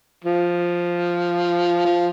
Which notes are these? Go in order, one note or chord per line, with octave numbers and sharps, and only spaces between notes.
F3
F3